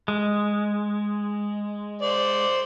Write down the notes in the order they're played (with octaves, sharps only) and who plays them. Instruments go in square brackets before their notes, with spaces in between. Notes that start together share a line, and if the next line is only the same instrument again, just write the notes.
[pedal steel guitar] G#3
[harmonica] C5 D5